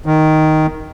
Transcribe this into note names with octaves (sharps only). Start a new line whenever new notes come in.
D#3